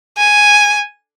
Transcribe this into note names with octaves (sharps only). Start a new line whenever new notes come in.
G#5